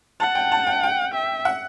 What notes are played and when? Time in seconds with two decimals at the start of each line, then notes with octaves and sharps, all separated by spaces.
0.20 F#5 A5
0.35 G5
0.52 A5
0.67 G5
0.83 G5
1.14 E5
1.45 F#5